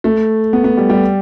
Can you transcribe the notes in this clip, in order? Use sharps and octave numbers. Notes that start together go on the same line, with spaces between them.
A3
B3
B3
G3
G3